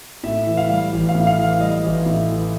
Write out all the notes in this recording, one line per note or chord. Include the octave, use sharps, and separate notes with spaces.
A2 E5
E3
F5
G3
A1
F5
A2
F5
E3
F5
G3 D#5
A1
A2
E3